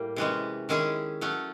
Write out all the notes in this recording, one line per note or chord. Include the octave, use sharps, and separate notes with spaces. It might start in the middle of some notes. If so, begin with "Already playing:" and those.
Already playing: A2 G3 A#3
C3 E3 G#3 C#4
D#3 G#3 C#4 E4 G#4
F#3 A3 C#4